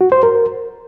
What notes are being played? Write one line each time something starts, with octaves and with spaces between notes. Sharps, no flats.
F#4
C5
A#4